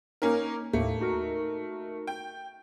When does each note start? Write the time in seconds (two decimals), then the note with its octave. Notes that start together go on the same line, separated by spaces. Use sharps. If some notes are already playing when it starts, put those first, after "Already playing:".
0.22 A#3 C#4 D#4 A#4
0.73 D#2 A2 A3 A#3
1.00 D#4 F#4 A#4
2.07 G5